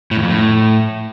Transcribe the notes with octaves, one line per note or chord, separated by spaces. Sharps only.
A2
E2
F2
A2